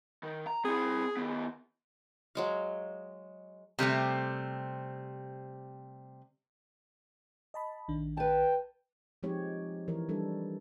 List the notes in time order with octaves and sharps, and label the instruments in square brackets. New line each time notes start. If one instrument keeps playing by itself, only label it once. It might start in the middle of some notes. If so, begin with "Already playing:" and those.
[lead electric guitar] D#3
A#5
[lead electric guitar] C4 E4 [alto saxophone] G#4
[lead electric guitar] D#3 B3
[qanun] F#3 G#3 F5
[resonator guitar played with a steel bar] C3 G3 A3 C4
[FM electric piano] D#5 A5 B5
A#1 D#3 D4
[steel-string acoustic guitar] B4 A5 [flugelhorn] G5
[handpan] F3 G#3 C4 D#4 G4 C#5
E3 A#4 C#5
G3 D4 A4